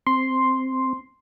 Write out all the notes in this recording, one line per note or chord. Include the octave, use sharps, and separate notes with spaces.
C4 C6